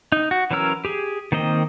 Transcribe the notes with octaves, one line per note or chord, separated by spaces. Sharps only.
D#4
F#4
E3 F#3 C#4 A#4 E6
G4 G#4
D#3 A#3 C4 D#5